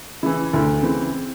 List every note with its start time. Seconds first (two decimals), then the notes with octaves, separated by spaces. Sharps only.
0.23 C#3 E3 E4
0.53 D2 E4
0.83 C#3 E3 C4